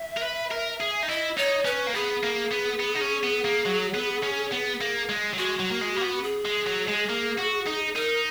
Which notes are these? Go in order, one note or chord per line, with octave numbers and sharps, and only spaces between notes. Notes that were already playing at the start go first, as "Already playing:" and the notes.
Already playing: E5
A#4
B4
A#4
G#4
D#4
E4 D#5
D#4 C#5
C#4 B4
A#3
B3 G#4
A#3
B3
B3
D#4
C#4
B3
A#3
F#3
B3
C#4
B3
A#3
G#3
F#3
G#3 F#4
F#3
A#3
G#3
A#3
B3
G#4
G#3
F#3
G#3
A#3
F#4
D#4
D#4 A#4